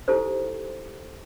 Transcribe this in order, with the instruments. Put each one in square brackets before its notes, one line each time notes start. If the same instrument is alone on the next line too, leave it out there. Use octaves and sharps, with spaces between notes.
[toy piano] D#4 E4 G4 A4 C5